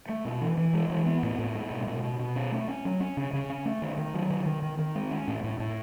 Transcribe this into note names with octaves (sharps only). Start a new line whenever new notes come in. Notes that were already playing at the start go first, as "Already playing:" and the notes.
A3
B2
E3
E3
G#3
E3
B3
A2
A2
G#3
B2
B2
B2
B2
C#4
A3
C#4
F#3
C#4
C#3
C#3
C#4
A3
D#3
D#3
F#3
D#3
D#3
D#3
D#3
G#3
C#4
A2
A2
A2